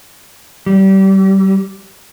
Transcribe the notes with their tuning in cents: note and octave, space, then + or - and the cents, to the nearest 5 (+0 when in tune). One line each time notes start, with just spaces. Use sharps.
G3 -25